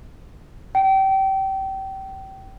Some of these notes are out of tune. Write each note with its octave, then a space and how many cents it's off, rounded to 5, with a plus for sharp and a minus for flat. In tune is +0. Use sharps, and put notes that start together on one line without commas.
G5 -25